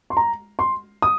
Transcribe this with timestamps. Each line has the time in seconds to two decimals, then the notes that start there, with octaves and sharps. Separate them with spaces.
0.10 C6
0.17 A#5
0.59 C6
1.02 D#6